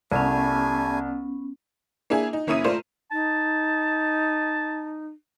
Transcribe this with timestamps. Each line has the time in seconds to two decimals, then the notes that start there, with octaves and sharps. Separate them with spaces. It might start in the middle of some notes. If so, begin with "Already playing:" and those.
0.12 C2 G3 A3 B3 C#4 G#5
2.10 A#3 D4 E4 G#4 G#5
2.33 D#4
2.47 F#1 A#3 C#4 E4 D#6 D#7
2.64 A3 F4 A#4 C5 D5
3.11 D#4 A5